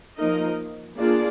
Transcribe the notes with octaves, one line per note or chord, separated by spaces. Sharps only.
F3 A#3 D#4 A#4 D#5
A#3 D4 F4 G#4 D5